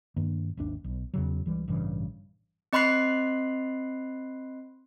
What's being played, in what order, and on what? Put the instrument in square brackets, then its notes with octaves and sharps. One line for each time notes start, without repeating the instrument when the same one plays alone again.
[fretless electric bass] G2 D#3 A#3 D4
G#1 D#2 D4
B1
E2 C#3 F#3
C#2 E3 G3
A1 G2 C#3 E3
[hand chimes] C4 D#5 B5 C6 F#6 C7